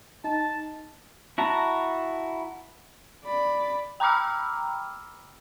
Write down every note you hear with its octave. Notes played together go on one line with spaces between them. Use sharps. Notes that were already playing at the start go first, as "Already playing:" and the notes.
D#4 A5
E4 F#4 A5 A#5
D5 B5
G5 A#5 B5 D6 E6 F6